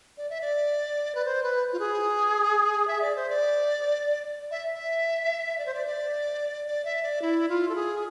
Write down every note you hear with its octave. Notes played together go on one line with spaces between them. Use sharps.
D5
E5
D5
B4
C5
B4
F4
G#4
E5
D5
C5
D5
E5
E5
D5
C5
D5
D5
D5
E5
D5
E4
F4
A4
G#4